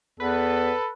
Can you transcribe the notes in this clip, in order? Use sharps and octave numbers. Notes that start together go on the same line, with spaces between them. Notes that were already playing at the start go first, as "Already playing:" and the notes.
E2 A4 B4